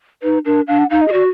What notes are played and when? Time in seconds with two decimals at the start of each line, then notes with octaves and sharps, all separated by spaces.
0.23 D#4 B4
0.45 D4 A#4
0.68 D4 F5
0.79 F#5
0.90 D#4 F5
1.01 D#5
1.08 G#4
1.12 F#4 D5